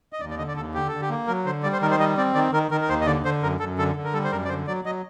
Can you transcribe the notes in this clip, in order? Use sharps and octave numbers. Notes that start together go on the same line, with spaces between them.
D#5
D#2 D5
D5
D3 D#5
D5
D#2 A4
D3 G4
D3 A4
G4
A#3
F#3 A#4
D3 C5
G3 D5
C5
D#3 A#4
C5
G3 D#5
C4 D5
D#3 D5
D#3 A#4
D#3 A#4
A#4
D#2 C5
D#5
D3 D5
D3 C5
F#2 A#4
F#2 A4
D3 A4
D3
A#4
G3 A4
C5
F#2 A#4
D5
D3 C5
F#3 D5
F#3 D#5